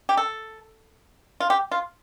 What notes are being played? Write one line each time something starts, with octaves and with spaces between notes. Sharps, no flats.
G4
A4
F4
G4
F4